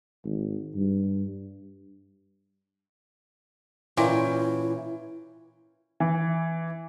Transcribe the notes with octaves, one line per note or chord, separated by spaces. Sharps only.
G#1
G2
A#2 E3 C#4 E4 G5
E3